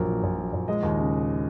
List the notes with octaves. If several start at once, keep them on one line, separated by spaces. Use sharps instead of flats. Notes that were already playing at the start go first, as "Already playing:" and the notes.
Already playing: A#1 F#3 A#4
A#2
A#1
F#3
A#1
G#3 D#5
D#2
C#3